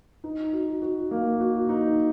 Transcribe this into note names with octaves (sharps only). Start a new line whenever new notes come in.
D#4
F#4
F#4
A#3
F#4
D#4